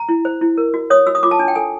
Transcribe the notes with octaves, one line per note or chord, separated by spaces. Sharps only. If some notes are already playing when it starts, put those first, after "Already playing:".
Already playing: A#5
E4
C5
E4
A#4
F#4
C#5 D#6
F#4 E6
D#6
F4 D6
A5
D4 G#5
G5
A4 G#5